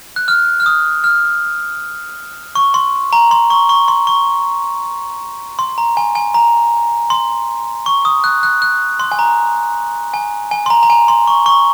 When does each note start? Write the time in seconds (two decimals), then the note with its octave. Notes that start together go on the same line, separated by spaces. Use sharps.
0.16 F#6
0.28 F6
0.60 F6
0.66 D#6
1.04 F6
2.55 C#6
2.74 C6
3.13 A#5
3.31 C6
3.50 C#6
3.69 C#6
3.88 C6
4.07 C#6
5.59 C6
5.78 A#5
5.97 G#5
6.15 G#5
6.34 A#5
7.10 C6
7.86 C#6
8.05 D#6
8.24 F#6
8.43 F#6
8.62 F#6
9.00 C6
9.12 G#5
9.19 A#5
10.14 G#5
10.51 G#5
10.66 C6
10.70 A#5
10.83 A#5
10.90 G#5
11.08 C6
11.27 C#6
11.46 C#6